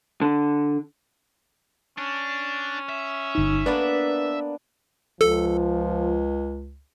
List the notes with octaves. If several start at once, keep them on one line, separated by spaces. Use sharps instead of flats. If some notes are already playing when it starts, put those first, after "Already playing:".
D3
C#4 D4
E5
G1 D#4
A#3 B3 D4 B4
C#2 F3 A4